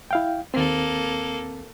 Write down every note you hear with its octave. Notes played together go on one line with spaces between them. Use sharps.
E4 F5 G5
D#2 A#3 C4 A4